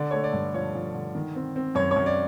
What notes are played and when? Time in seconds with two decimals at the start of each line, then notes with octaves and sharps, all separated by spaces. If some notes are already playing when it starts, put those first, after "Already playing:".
Already playing: D3 D5
0.11 A3 C#5
0.24 D5
0.33 G2
0.54 F3 C#5
0.75 F3
0.94 D3
1.15 D#3
1.35 C4
1.56 C4
1.75 F#2 C#5
1.91 C#5
1.96 F#2
2.06 D5